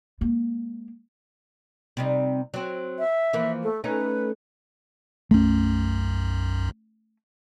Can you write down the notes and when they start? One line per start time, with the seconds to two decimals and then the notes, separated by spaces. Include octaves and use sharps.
0.21 G#3 A#3
1.97 C3 G3 D#4
2.54 F#3 C4
2.99 E5
3.33 E3 F3 A#3
3.63 A3
3.84 A3 C#4 D#4 B4
5.31 B1 F#2 A3 C#4